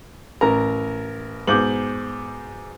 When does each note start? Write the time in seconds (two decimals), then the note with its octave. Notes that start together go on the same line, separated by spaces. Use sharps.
0.41 A1 A#4 A#5
1.47 G#2 B2 D6 G6 F#7